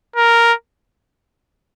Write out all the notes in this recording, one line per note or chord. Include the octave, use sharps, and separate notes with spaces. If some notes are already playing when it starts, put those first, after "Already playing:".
A#4